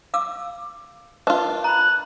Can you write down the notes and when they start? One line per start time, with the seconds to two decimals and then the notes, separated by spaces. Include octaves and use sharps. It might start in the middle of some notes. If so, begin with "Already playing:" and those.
0.14 F5 D6 E6
1.27 D4 F4 A#4 B4 D#5
1.64 A#5 B5 F#6